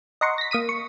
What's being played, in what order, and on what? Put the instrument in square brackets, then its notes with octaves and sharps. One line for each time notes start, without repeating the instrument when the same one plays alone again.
[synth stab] D#5 F#5 A#5 C6 C#6
A#6 B6
A#3 D#6 B6 D#7
C#6